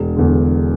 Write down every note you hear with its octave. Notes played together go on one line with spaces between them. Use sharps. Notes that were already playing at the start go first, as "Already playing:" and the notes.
Already playing: E1
E2 D3